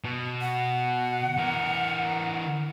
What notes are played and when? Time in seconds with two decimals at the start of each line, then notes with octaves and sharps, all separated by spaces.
0.04 B2
0.41 F#5
1.38 E3 A#4